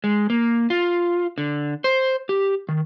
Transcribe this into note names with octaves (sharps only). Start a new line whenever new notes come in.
G#3
A#3
F4
D3
C5
G4
D#3